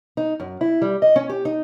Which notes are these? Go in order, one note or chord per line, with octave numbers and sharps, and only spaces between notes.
D#4
F#2
E4
G3
D#5
C#4
G4
D#4